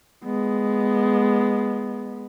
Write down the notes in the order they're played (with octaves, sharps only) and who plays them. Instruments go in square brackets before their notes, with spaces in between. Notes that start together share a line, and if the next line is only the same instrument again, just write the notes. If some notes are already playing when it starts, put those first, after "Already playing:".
[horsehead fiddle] G#3 B3